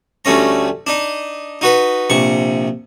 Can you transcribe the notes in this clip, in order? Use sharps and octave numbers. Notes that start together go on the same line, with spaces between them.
D2 G3 A3 C#4 A#5
D4 D#4
D#4 F#4 B4
A#1 C3 C#6